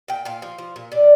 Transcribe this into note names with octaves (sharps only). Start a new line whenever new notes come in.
A#2 G5
A#2 F5
F3
F3
A#2
A#2 D5